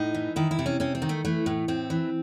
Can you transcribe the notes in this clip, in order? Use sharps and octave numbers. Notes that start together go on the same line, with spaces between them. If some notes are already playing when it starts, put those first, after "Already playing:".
Already playing: A2 D#4
E3
D#3 E4
E4
C3
C#4
C3 C#4
C4
D#3
A3
E3 A3
A2
A2 C4
E3